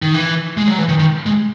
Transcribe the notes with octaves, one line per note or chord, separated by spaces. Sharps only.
D#3
E3
G#3
F#3
E3
D#3
D#3
G#3